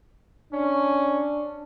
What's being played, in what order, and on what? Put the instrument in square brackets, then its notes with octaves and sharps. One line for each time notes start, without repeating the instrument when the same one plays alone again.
[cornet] C#4 [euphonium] D4